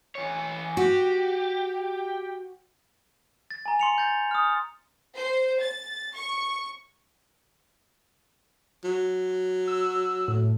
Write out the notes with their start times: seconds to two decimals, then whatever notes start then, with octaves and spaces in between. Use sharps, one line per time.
0.15 E3 C#5
0.77 F#4 G4
3.51 A6
3.66 G#5 A#5
3.80 C6 C#7 F7
3.98 G6 A6
4.31 D#6 F6
5.16 C5
5.62 A6
6.15 C#6
8.84 F#3
9.68 E6
10.28 A2